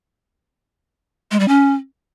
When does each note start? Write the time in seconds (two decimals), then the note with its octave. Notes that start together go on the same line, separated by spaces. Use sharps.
1.31 G#3
1.40 G3
1.48 C#4